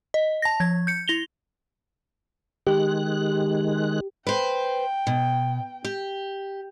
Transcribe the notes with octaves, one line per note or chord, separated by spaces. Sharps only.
D#5
A5 A#6
F3 G#6
G6 C#7
E4 A#6 F7 G7
D#3 G#3 G4 F#6
B4 C5 G5
B2
G4